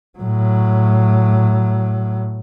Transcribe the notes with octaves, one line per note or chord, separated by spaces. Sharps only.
A2 F#3